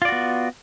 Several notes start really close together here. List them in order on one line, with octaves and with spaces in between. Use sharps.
F4 D5 F#4 B3